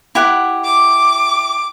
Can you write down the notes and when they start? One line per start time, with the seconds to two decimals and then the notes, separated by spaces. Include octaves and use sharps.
0.15 E4 G4 F#5
0.65 D6